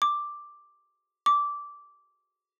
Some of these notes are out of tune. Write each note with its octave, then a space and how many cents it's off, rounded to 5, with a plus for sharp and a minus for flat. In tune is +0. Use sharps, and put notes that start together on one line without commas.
D6 +5
D6 -15